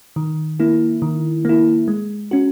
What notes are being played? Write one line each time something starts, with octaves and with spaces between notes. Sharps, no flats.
D#3
A#3 E4
D#3
A#3 E4
G#3
C#4 F#4